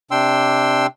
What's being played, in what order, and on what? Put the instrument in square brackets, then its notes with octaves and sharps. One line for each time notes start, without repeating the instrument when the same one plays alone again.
[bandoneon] C3 D4 G5 C6 E6